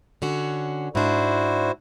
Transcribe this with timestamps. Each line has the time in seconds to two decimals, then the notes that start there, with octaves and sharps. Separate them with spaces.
0.22 D3 C#4 F#4
0.95 G#2 D4 E4 F#4 C5